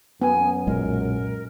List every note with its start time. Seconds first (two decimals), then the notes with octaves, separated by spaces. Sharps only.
0.21 F#2 B3 G#5
0.67 B1 A#2 G#3 A#4